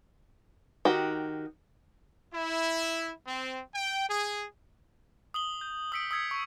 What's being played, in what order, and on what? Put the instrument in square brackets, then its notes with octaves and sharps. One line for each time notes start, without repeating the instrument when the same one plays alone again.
[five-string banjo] D#3 F#4 G4
[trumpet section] E4
C4
G5
G#4
[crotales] D#6 F#7 G7
G6
D#6 E6 B6 C#7 D7
D#6 E6 G#6 B6 C#7
C#6